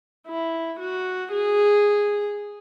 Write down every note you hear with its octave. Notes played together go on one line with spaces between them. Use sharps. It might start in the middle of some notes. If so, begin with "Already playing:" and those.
E4
F#4
G#4